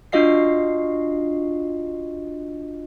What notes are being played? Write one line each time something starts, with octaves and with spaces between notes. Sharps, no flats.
D4 F4 F#4 D#5 F5 C7